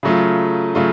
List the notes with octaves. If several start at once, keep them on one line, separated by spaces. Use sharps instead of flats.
C#3 F#3 A3 F4
C#3 F#3 A3 F4